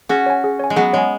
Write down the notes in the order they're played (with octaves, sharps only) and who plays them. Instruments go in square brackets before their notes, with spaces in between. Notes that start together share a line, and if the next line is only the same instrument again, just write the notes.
[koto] C#4 F#4 [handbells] G#4
[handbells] C#5 G#5
G#4
C#5 G#5
[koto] G#3
[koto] F#3 B3 [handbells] G#4
[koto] G#3 [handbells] C#5 G#5